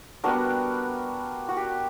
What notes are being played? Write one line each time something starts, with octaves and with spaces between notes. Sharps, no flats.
G3 B3 D4 F#4 A#4
F#4
G4